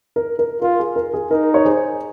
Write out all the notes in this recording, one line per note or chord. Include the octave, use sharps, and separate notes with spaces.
A#4
A#4
F4 A#4
G#4
A#4
G#4
D#4 A#4
C#5
G#4 C5